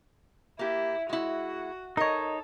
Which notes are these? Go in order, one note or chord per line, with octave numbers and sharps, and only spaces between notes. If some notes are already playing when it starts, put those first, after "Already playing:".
A#3 E4 G4
G#3 E4 F#4
D#4 A4 A#4 C#5 D#5